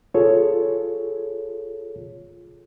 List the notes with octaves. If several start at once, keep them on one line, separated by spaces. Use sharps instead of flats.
F4 G#4 A4 C#5